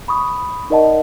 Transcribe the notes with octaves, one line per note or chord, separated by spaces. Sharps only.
B5 C#6 D#6
D#4 A#4 D5 D#5 F#5 A5